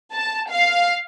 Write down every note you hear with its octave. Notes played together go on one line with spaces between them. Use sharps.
A5
F5